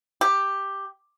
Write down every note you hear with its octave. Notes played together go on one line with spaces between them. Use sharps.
G4